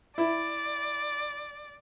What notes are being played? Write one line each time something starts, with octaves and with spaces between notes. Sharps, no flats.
E4 D5